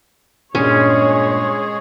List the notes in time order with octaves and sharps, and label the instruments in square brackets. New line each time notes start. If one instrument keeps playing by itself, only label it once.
[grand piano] G2 A#2 D#7 [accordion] G#3 G#4 [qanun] C#4 [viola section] C#5